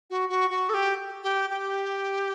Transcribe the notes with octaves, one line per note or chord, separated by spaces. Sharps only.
F#4
F#4
F#4
A4
G4
G4
G4